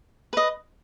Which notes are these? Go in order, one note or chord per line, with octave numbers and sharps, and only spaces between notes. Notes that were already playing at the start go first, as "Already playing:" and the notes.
B4 D#5